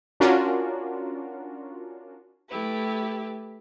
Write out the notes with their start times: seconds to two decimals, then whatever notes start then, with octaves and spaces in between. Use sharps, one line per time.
0.20 C#4 D4 F4 F#4 A#4
2.48 A3 E4 G4 B4